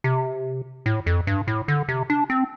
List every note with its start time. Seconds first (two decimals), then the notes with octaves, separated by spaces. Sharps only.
0.04 C3
0.86 A2
1.06 F2
1.27 G2
1.47 A2
1.68 D3
1.88 C3
2.10 D4
2.30 C4